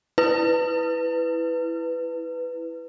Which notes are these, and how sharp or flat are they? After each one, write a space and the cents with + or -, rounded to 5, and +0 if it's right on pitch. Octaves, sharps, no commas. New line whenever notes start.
E4 +0 B4 +10